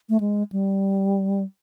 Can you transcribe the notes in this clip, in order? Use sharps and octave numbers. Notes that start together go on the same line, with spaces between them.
A3
G#3
G3